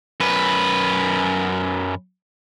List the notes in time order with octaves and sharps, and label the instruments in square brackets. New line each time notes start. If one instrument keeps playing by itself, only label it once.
[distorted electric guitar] F#2 B4